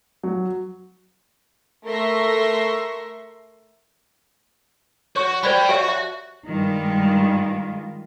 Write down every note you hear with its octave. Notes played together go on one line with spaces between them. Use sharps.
F#3
A3 A#4 E5 C6 C#6 A#6
F#4 C#5 C#6
G3 C5 D5 G5 B5
F#4 G4 C#5 E5
E5
G2 D#3 G3 G#3 F4